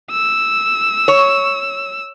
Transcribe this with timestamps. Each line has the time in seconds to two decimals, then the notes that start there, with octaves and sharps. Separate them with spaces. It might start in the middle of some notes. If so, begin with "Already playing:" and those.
0.11 E6
1.08 C#5